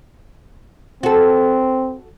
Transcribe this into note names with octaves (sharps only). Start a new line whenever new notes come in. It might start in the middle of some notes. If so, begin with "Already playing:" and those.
C4 F#4 A4